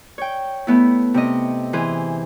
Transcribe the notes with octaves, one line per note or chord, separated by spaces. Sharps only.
C#5 G5
A3 B3 E4
C3 C4 D#5
E3 G#4 C5